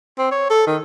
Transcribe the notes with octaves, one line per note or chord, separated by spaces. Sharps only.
C4
C#5
A4
D#3